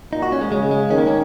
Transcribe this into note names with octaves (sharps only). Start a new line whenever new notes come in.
A#2 D#4
F#4
C#4
G#3
C#3 G#3
G#3
D#3 C#4
A#3
C#4